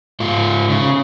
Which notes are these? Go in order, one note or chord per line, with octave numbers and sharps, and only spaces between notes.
G#2 F4
C#3